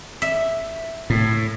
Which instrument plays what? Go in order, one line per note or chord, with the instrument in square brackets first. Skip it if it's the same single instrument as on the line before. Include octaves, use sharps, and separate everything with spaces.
[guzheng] E5
[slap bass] A2